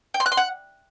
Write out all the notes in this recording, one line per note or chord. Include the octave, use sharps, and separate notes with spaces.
G5
C6
F#6
C6
F#5